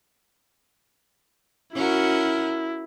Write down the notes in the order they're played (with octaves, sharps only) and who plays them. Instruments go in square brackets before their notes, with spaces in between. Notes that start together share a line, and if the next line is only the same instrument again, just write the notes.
[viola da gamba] C#4 F#4 A#4 [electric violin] E4